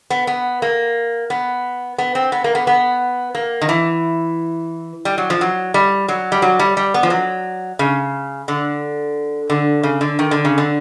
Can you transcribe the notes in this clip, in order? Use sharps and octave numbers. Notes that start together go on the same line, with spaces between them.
B3
B3
A#3
B3
B3
C4
B3
A#3
B3
B3
A#3
D#3
E3
G3
F#3
F3
F#3
G3
F#3
G3
F#3
G3
G3
B3
F3
F#3
C#3
D3
D3
C#3
D3
D#3
D3
C#3
D3